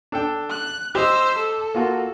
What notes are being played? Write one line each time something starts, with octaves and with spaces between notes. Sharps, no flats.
D4 A4 G5
F#6
G4 C5 D#5 E6
A4
A#3 F4 F#4